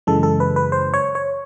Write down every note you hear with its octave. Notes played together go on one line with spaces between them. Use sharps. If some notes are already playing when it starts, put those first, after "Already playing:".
F#2 C#3 E3 G#3 A4
A4
B4
B4
C5
C#5
C#5